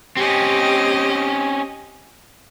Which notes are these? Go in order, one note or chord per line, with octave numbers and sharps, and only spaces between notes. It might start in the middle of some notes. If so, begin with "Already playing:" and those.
C4 C#4 G4 D#5